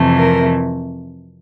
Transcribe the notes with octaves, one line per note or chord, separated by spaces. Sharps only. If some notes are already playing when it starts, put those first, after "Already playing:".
Already playing: F2 C3 E3 A3
A#4